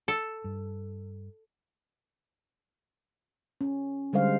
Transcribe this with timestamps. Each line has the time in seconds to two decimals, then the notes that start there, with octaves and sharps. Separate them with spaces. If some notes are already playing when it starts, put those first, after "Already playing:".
0.08 A4
0.44 G2
3.61 C#4
4.13 D3 G3 G#3 C5 F5